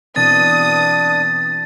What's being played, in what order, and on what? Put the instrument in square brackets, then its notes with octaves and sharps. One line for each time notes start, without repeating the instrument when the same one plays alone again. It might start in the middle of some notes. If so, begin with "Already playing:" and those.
[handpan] B2 E3 C4 [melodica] D4 [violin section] D#6 [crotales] A6